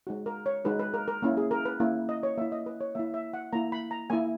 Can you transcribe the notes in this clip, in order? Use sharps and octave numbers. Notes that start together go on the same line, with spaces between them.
G#3 D#4 F#4
A#4
C#5
G#3 D#4 F#4 B4
B4
A#4
A#4
A#3 C#4 E4
G#4
A#4
B4
A#3 C#4 E4
D#5
C#5
A#3 E4 E5
D#5
B4
C#5
A#3 E4 E5
E5
F#5
A#3 E4 A#5
B5
A#5
A#3 E4 G#5